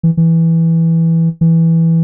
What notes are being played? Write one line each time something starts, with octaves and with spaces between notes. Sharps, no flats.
E3
E3
E3